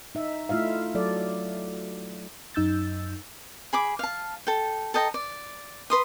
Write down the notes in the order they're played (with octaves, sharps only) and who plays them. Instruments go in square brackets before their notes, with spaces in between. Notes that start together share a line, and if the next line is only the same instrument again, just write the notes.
[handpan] D#4 E5
A3 E4 F4 E5 F5
F#3 A4 D5
[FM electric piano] F#2 D#4 E6 G6 A6
[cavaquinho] G#4 B5 D6
F5 A5
A4 G5
A4 D#5 G5 A#5
D5
B4 C6 D#6